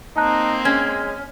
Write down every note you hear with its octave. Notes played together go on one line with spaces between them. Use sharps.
A#3 C4 D#4 A5 A#5 F#6
G#3 C#4 G#6